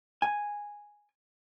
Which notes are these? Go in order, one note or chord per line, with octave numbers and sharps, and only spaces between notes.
G#5